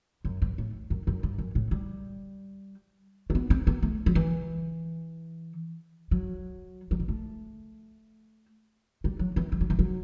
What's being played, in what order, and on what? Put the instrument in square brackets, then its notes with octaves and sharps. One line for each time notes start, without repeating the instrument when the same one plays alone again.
[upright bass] F#2
G2
A2
F#2
F#2
G2
F#2
A2
G3
A3
B3
C4
B3
A3
F#3
E3
F#3
F#3
G3
A3
G3
F#3
E3
G3
F#3
E3
F#3